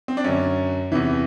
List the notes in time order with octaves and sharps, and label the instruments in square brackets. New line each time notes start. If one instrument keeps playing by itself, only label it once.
[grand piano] C4
D4
F#2 D3 C#4
E2 C3 E3